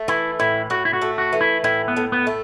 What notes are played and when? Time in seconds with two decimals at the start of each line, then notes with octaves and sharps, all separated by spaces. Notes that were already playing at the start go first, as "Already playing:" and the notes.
Already playing: A3
0.08 E3 E4
0.40 A2 E4
0.70 A2 F#4
0.85 E4
0.93 F#4
1.01 A3
1.18 F#4
1.33 E3
1.41 E4
1.64 A2 E4
1.88 B3
1.97 A2
2.12 B3
2.27 A3